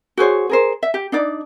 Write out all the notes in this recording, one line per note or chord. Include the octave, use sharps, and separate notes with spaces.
F#4 G#4 C5 C#5
G#4 A#4 C5
E5
G4
D4 D#4 D5